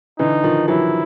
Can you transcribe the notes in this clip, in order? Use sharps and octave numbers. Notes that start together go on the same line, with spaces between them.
D3 E3 D#4
D#3 F3
E3 F#3 E4